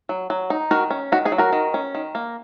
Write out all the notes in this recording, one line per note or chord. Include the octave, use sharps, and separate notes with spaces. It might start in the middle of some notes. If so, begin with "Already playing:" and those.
F#3
F#3
D#4
D#3 F#4 A#4
C#4
D#3 F#4
D#4 G#4
F#3
F#4 A#4
D#3
C#4
D#3
A#3